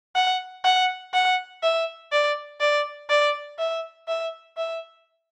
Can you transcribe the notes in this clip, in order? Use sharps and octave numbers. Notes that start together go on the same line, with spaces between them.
F#5
F#5
F#5
E5
D5
D5
D5
E5
E5
E5